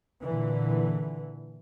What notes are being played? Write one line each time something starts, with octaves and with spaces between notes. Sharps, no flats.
A#2 D3 E3